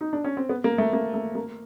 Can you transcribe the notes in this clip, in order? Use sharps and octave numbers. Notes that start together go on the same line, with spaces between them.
D#4
D4
C#4
C4
B3
A#3
A3
A#3
A3
A#3